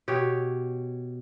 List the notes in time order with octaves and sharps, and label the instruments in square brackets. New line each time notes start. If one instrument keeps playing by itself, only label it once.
[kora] B2 G4 C#5